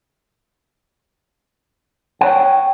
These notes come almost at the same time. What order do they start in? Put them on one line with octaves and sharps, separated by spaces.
F#5 C#5 G5